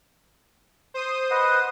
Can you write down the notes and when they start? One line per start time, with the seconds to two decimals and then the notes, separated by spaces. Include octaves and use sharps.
0.94 C5 D#6
1.31 B4 D#5 F#5